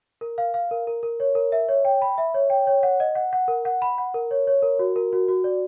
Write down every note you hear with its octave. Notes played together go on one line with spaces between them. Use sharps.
A#4
F5
F5
A#4
A#4
A#4
C#5
A#4
E5
C#5
G5
B5
E5
C#5
G5
C#5
F#5
D#5
F#5
F#5
A#4
F#5
B5
F#5
A#4
C#5
C#5
A#4
F#4
A#4
F#4
F#4
D5